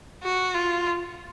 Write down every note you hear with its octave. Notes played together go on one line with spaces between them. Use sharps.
F#4
F4